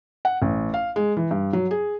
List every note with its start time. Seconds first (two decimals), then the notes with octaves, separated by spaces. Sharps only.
0.25 F#5
0.42 A1
0.74 F5
0.96 G#3
1.17 E3
1.31 G2
1.53 F#3
1.71 G#4